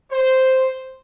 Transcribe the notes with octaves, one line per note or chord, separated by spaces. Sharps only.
C5